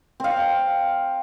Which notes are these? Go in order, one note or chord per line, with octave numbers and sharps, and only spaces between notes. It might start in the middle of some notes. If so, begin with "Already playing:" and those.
C4 F5